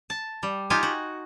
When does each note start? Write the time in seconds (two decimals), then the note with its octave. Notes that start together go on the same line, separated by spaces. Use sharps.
0.10 A5
0.43 G3
0.70 D#4 F4 G4 G#5
0.83 F#4